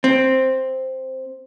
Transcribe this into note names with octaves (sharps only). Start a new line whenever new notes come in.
C4